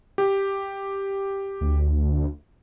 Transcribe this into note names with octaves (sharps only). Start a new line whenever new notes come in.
G4
D2